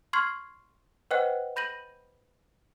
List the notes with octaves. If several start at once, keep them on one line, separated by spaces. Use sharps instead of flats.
C6 C#6 F6 G#6 C7
B4 C5 D#5 F#5 G5 F#6
B5 G6 A#6 D#7 F#7